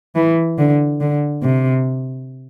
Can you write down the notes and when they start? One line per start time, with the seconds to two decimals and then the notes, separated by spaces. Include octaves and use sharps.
0.16 E3
0.59 D3
1.01 D3
1.43 C3